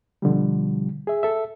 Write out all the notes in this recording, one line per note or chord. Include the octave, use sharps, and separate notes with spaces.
B2 D3 F3 G3
G#4 E5
A4 E5